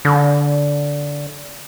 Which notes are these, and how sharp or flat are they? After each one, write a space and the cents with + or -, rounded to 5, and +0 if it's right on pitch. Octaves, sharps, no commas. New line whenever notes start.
D3 -15